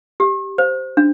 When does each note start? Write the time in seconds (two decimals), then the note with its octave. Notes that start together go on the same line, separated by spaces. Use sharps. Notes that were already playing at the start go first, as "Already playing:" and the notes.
0.20 G4
0.58 C5
0.97 D4